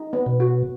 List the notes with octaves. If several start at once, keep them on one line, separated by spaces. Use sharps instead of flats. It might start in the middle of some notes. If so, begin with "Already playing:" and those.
Already playing: D#4
B3
B2
F#4